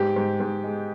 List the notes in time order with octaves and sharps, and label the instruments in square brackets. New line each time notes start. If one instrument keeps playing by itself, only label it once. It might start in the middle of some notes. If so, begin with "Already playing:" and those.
Already playing: [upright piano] G#2 G4
G#2
G#2
G#3